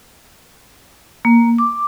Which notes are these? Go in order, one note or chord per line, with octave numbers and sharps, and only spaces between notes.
A#3
D6